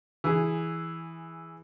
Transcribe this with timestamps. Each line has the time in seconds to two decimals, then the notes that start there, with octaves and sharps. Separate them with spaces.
0.24 E3 G#4